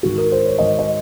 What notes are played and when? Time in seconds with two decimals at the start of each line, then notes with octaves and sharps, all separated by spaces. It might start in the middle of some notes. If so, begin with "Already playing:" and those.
0.03 G#2 D#3 F#4
0.18 A#4
0.32 C5
0.45 C#5
0.59 G#2 D#3 D#5
0.79 D#5